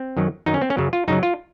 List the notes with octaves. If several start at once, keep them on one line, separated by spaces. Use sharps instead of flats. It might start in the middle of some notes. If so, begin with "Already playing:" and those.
Already playing: C4
F#2 D#3 F#3
F#2 D#3 F#3 D#4
C#4
C4
C#4
F#2 C#3 F#3
F4
F#2 C#3 F#3 D#4
F4